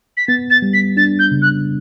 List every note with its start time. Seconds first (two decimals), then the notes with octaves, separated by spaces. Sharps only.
0.17 B6
0.28 B3 A6
0.50 A6
0.62 G3
0.74 B6
0.97 D4 A6
1.19 G6
1.31 C#3
1.42 F#6